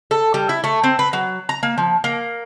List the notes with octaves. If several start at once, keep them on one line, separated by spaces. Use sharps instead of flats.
A4
G3
E4
A3
C4
B4
F#3
A#5
A#3
F3
A#3